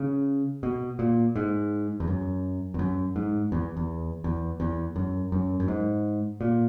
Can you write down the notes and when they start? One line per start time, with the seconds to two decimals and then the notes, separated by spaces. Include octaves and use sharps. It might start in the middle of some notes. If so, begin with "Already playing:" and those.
Already playing: C#3
0.63 B2
0.99 A#2
1.36 G#2
2.00 E2
2.07 F#2
2.74 E2
2.79 F#2
3.16 G#2
3.52 E2
3.77 E2
4.24 E2
4.60 E2
4.96 F#2
5.32 F#2
5.60 F#2
5.68 G#2
6.41 A#2